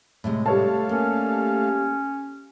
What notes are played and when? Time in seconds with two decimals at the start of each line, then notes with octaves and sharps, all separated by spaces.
0.24 A2 C3 G#3
0.46 G3 A3 A4 C#5 F5 A5
0.89 A#3 C#4